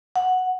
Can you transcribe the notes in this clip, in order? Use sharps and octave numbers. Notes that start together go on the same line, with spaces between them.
F#5